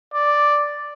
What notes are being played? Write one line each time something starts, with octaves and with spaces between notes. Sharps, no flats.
D5